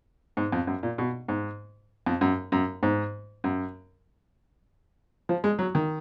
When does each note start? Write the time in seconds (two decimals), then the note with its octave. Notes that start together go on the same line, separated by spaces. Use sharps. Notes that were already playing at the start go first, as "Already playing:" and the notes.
0.37 G#2
0.52 F2
0.67 F#2
0.83 A#2
0.98 B2
1.28 G#2
2.06 F2
2.21 F#2
2.52 F#2
2.83 G#2
3.44 F#2
5.29 F3
5.44 G#3
5.59 F#3
5.75 D#3